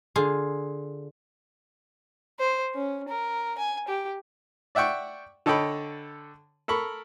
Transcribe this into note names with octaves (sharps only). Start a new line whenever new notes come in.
D3 F4 G#4
C5
C#4
A#4
G#5
G4
D5 E5 F#5 G5 C#6
D3 A4 C#5 D#5 G5 B5
A4 A#4 B5 C#6